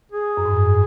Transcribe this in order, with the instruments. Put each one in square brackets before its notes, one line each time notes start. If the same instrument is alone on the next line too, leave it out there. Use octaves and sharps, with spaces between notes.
[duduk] G#4
[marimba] F#2
G#2
F#2